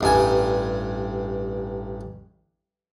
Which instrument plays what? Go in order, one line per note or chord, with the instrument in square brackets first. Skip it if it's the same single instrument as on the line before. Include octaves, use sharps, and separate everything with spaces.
[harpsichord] A1 G2 G#5